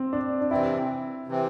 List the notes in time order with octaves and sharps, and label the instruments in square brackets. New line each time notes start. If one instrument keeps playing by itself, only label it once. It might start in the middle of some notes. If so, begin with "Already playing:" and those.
Already playing: [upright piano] C4
D4
D4
[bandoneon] C3 E3 C4 [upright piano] E4
[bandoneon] C3 E3 C4